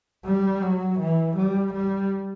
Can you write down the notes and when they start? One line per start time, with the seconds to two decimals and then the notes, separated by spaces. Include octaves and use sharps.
0.25 G3
0.62 F#3
0.99 E3
1.36 G3
1.73 G3